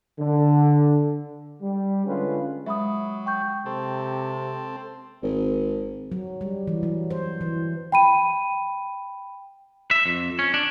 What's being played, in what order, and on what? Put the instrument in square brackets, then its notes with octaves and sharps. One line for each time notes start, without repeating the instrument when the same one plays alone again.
[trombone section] D3
G3
D3 G#3 C#4 F4 G#4 B4
[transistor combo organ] F#3 [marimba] G#3 [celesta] E5 B5 D#6
[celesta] G5 C#6 G6
[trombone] C3 [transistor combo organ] C4 A4
[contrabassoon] G#1
[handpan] F#3
G3
E3
F#3
C5
E3
[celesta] G5 B5 D#7
[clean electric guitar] E5
F2
C#4
D4